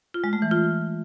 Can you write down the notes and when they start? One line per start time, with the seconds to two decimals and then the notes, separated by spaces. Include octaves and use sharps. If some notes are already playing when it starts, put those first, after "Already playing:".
0.14 F4
0.24 G#3
0.33 A3
0.42 E3
0.51 F4